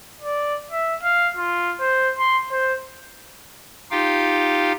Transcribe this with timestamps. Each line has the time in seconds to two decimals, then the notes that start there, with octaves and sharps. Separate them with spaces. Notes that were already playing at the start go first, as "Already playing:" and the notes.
0.21 D5
0.71 E5
1.03 F5
1.36 F4
1.80 C5
2.18 C6
2.51 C5
3.91 D#4 F4 G4 F5 G5